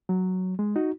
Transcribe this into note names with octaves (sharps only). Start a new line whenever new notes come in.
F#3
G#3
D#4 F#4